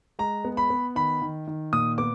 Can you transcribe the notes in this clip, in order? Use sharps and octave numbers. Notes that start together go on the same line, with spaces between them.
G#3 A#5
B3
B5
B3
D#3 B5
D#3
D#3
A#2 D#6
B3 D6